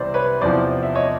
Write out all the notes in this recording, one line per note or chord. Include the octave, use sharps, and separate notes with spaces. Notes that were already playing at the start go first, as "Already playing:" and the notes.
Already playing: C2 C3 E3 C5 D5
B4 C#5
E2 C3 F3 C5 D5
E5
C#5 D#5